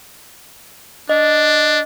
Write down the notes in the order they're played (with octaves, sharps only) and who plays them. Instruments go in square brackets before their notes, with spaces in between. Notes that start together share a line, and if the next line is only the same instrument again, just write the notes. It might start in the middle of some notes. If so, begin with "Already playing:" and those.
[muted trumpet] D4 [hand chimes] D#5